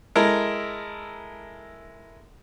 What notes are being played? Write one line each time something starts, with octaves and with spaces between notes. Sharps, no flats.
G#3 E4 A4 A#4